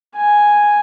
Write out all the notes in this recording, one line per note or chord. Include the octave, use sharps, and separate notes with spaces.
G#5